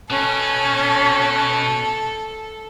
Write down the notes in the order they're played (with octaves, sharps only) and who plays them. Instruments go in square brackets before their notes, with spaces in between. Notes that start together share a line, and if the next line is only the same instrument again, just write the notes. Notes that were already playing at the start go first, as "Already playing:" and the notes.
[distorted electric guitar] B2 [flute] C#4 [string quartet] A4